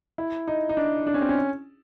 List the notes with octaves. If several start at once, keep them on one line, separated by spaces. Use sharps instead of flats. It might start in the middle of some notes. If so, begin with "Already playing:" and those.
E4
D#4
D#4
D4
D4
C#4
C4
C#4